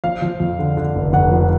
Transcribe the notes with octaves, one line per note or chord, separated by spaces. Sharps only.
F3 F5
F3
F2
D3
D3
F1
F1 F#5
F3